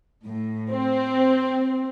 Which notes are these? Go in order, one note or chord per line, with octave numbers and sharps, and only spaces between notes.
A2
C4